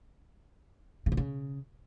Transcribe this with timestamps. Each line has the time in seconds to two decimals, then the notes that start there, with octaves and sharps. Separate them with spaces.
1.06 C#3
1.12 D3
1.17 C#3